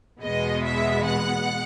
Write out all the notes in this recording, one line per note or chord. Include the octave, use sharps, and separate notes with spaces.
E2 B2 G#3 B3 D#5
E5
F#5